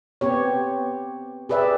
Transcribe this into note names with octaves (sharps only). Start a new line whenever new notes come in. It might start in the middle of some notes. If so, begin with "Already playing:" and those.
B3 C4 G4 C#5
G4 G#4 B4 D5 E5